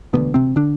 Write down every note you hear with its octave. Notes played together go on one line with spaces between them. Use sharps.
E1 D2 B2 D3 B3
C3 C4
D3 D4